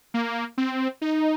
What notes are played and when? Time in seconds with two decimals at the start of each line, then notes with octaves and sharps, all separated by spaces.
0.14 A#3
0.58 C4
1.02 D#4